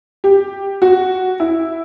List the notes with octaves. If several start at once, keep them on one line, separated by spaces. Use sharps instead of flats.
G4
F#4
E4